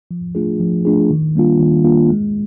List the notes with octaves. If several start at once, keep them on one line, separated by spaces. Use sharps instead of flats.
F3
A3 D4 F4 G#4
F3
A3 D4 F4 G#4
D#3
G3 A#3 D4 F4
D#3
G3 A#3 D4 F4
G#3